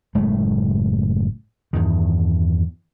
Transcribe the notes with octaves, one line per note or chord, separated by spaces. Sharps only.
F#1 A2 G#3 A3
E2 G2 D#3